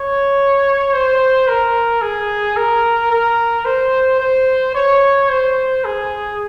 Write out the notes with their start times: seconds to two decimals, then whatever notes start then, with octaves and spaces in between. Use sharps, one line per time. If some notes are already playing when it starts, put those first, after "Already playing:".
Already playing: C#5
0.93 C5
1.48 A#4
2.01 G#4
2.56 A#4
3.11 A#4
3.65 C5
4.20 C5
4.75 C#5
5.29 C5
5.84 G#4